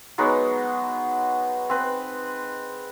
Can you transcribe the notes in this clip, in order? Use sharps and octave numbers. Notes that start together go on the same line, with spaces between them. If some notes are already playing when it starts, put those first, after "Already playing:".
F#3 G#3 B3 D#4
C4 B4